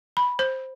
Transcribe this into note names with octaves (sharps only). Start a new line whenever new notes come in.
B5
C5